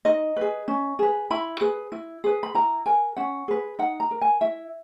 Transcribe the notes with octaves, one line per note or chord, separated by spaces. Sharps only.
D#4 D#5
G#4 B4
C#4
G#4 B4
E4 B5
G#4 B4
E4
G#4 B4
B5
E4 A#5
A#4 G#5
C#4 F#5
G#4 B4
D#4 F#5
A#5
A#4
G#5
E4 E5